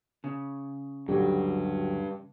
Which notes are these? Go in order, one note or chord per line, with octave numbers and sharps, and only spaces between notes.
C#3
D2 G2 F#3 G4